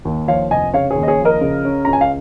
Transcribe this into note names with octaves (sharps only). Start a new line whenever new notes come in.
D#2
F3 C#5 F5
F1 D#5 G#5
C#3 C#5 F5
G#4 C#5
D#2
D#5
G#4 C#5
F3
A#4 D#5
C#3
C#4
C#2 A#5
G#5
F5